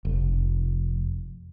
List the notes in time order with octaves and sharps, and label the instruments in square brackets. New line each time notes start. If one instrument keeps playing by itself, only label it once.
[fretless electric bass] F1